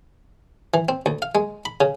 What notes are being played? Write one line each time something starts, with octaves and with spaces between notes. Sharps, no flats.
E3
C4
D2
F5
G#3
B5
C#3